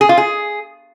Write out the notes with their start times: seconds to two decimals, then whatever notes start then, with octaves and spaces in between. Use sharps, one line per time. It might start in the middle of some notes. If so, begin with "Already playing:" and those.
0.01 G#4
0.09 F4
0.18 G#4